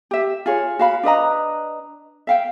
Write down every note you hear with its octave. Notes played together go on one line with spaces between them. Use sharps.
G4 E5
F4 G#4 C#5
F#4 F5 B5
D4 B4 D#5 A#5
E5 F5 G5